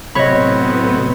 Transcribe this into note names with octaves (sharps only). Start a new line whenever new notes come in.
A2 C3 F#3 B3 C#5 D#5 B5